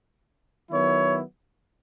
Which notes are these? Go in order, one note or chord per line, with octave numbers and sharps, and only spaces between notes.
D#3 F#3 B3 E4 C#5